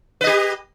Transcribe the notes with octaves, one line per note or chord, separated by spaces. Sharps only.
G4 B4 D#5